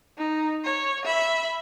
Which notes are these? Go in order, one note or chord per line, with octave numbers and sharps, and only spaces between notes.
D#4
C#5
E5 B5